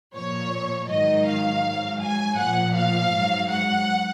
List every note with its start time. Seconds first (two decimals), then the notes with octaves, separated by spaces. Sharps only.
0.14 A#2 F3 C#5
0.89 G#2 D#3 F#3 D#5
1.26 F5
1.63 G#2 F#3
2.01 G#5
2.37 A#2 F3 F#5
2.75 F5
3.12 G#2 F#3
3.49 F#5